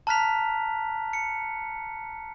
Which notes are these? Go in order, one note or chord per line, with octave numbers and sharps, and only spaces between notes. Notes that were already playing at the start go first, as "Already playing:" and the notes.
A5 A#5 F6 F#6 B6 F7
C#7